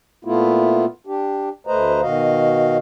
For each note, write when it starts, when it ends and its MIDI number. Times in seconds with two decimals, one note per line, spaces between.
0.25 0.85 46
0.25 0.85 57
0.25 0.85 59
0.25 0.85 64
0.25 0.85 65
1.07 1.49 62
1.07 1.49 67
1.67 2.01 38
1.67 2.01 57
1.67 2.01 71
1.67 2.01 72
1.67 2.01 75
1.67 2.01 82
2.01 2.78 47
2.01 2.78 51
2.01 2.78 66
2.01 2.78 75
2.01 2.78 77